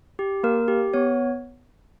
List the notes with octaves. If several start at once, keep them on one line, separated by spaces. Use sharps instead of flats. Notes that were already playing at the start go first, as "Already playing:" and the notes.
G4
A#3 A#4
G4
B3 C#5